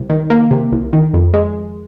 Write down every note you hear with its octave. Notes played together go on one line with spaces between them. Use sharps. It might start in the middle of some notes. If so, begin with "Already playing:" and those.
Already playing: C2 C3
D#3
A#3
C3
C2
D#3
F2
G#3